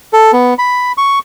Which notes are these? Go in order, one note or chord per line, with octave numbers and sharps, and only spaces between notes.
A4
B3
B5
C#6